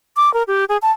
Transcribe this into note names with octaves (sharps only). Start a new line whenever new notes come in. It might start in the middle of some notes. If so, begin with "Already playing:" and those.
D6
A#4
G4
G#4
A5